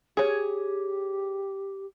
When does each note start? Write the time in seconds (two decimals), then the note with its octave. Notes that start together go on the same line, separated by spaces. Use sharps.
0.17 G4 G#4 C#5